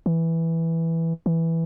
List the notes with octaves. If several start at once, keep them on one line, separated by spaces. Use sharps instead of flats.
E3
E3